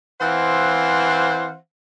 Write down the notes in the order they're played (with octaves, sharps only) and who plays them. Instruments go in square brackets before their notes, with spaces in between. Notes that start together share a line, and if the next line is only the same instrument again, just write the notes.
[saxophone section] E3 C4 C5 F5 F#5